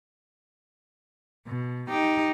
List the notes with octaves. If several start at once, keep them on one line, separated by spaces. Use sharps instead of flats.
B2
D#4 G4